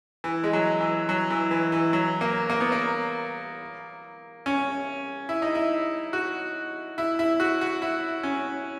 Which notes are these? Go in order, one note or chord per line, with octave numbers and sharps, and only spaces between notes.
E3
G#3
F#3
E3
F#3
E3
E3
E3
F#3
A#3
A#3
B3
A#3
C#4
E4
D#4
E4
F#4
E4
E4
F#4
F#4
E4
C#4